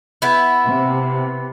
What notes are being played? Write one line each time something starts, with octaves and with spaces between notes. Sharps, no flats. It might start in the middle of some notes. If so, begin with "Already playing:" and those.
B3 E4
C3